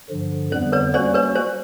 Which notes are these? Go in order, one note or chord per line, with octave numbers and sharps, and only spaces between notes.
G2 D3 F3
F2 D3 G3 B3 C5
B4 C#5
G3 A#3 C#4 F#4 C5 D5
B4 C#5
C5